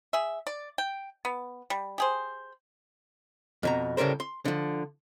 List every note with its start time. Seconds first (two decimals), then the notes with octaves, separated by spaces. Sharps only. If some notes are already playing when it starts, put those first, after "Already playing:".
0.13 G#4 E5
0.47 D5
0.78 G5
1.25 B3
1.70 G3
1.98 G4 G#4 C5
3.63 F2 B2 A#5
3.97 A2 C#3 G3 A#4 C5
4.20 C6
4.45 D3 F3